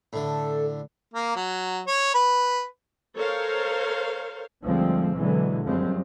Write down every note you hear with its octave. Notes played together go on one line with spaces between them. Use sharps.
A2 D3 A4
A#3
F#3
C#5
B4
A4 A#4 C5 C#5 F5
D2 D3 F3 G3 G#3 C4
B2 D3 E3 F#3 G#3
F#2 F3 G3 G#3 C4